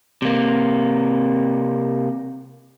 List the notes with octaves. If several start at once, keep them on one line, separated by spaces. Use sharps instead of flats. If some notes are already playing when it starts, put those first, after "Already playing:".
C3 A#3